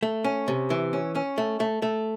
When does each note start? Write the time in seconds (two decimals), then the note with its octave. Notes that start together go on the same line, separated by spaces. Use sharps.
0.03 A3
0.24 C#4
0.48 C3
0.70 E3
0.93 C#4
1.15 C#4
1.38 A3
1.60 A3
1.82 A3